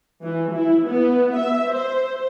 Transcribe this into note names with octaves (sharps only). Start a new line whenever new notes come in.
E3
E4
B3
E5
C5